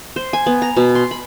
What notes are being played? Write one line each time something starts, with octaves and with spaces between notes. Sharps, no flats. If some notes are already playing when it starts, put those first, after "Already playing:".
C5
G#5
B3
A#5
B2
C6
B5